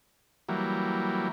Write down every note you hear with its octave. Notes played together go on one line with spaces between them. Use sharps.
E3 F#3 G3 A#3